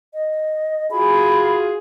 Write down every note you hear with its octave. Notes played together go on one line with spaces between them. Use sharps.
D#5
F4 F#4 G#4 B5